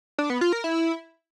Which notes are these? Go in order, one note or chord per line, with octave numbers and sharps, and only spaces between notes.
D4
B3
F4
A#4
E4